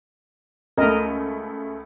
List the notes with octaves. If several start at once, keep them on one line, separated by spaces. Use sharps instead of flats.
C#2 A3 A#4 D#5